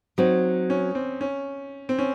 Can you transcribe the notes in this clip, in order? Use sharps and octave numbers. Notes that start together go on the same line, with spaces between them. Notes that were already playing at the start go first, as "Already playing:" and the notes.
F#3 C4 D#4 F#4
C#4
C4
C#4
C4
C#4